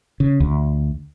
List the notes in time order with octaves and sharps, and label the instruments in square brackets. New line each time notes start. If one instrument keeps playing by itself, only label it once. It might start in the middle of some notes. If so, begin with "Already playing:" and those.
[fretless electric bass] C#3
D2